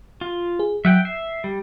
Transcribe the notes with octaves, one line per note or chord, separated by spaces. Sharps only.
F4
G#4
F#3 E5 F#5 G5
E5 C7
G3